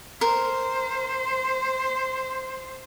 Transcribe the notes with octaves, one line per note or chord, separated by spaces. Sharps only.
A#4 C5